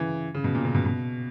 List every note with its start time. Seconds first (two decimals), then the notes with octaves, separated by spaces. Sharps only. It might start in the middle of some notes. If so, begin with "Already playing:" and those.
Already playing: C#3 E3
0.34 C#3
0.44 B2
0.55 A#2
0.65 C#3
0.75 B2
0.85 B2